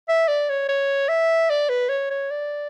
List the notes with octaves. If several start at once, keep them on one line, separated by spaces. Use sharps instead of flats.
E5
D5
C#5
C#5
E5
D5
B4
C#5
C#5
D5